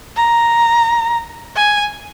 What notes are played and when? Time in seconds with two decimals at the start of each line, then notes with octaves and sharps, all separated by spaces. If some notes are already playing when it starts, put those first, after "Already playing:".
0.17 A#5
1.56 G#5